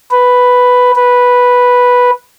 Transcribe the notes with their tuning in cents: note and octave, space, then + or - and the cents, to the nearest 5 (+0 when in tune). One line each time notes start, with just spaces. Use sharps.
B4 +5
B4 -5